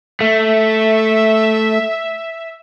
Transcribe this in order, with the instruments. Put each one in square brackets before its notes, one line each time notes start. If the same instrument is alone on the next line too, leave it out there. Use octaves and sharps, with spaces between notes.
[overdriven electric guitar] A3 [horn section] E5